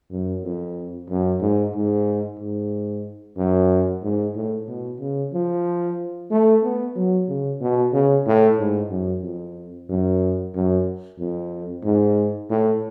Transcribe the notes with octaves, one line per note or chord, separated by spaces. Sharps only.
F#2
F2
F#2
G#2
G#2
G#2
F#2
G#2
A2
B2
C#3
F3
A3
B3
F#3
C#3
B2
C#3
A2
G#2
F#2
F2
F#2
F#2
F2
G#2
A2